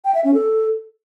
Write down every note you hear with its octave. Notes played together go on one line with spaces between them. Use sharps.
G5
E5
C#4
A4